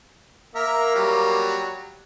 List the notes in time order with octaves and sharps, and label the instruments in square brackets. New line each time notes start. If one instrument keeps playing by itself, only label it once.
[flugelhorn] A#3 [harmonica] A#4 E5
[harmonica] F#3 G3